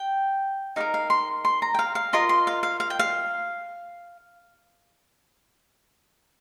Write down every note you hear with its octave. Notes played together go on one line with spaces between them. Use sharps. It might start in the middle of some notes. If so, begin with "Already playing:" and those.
Already playing: G5
D#4 G4 A#4 F5
F5
C6
C6
A#5
G5
F5
F5
F4 A#4 D#5 C6
C6
F5
F5
F5
G5
F5